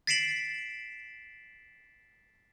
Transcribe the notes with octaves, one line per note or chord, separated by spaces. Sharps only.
A6 B6 C7 D7 E7 F#7